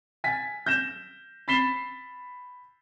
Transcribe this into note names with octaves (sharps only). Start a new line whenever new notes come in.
G#5 A6 B6
G6 A#6 E7
B5 A6 B6 C7 E7 G7